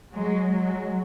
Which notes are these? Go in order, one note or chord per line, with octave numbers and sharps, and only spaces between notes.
F#3 G#3
F#3 G#3